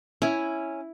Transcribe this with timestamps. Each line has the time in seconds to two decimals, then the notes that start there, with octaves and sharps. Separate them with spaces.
0.22 C#4 E4